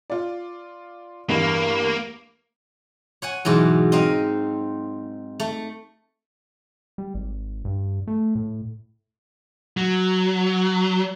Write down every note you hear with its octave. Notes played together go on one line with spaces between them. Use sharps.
F4 D5
E2 G2 A#3
C#5 F#5 G#5
G#2 B2 E3 F#3
C4 D#4 D#5 F5
A3
G3
G#1
G2
A3
A2
F#3